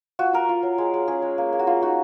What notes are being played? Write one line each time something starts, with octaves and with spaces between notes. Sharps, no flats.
F4 F#4
F4 A#4
F4
F#3
G#3
G#3
C#4 G#4
G#3
A#3
A#3
F#4
A#3 F4
D#4 F#4